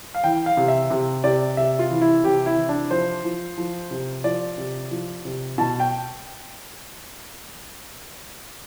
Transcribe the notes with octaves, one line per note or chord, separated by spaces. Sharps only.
F5
E3 G5
F5
C3
E5
C3
C3 D5
C3 E5
F4
E3
E4
C3 G4
E4
E3
D4
F3 C5
F3
F3
C3
F3 D5
C3
F3
C3
B2 A5
G5